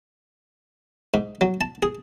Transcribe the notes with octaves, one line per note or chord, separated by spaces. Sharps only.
G#2
F#3
A5
G#4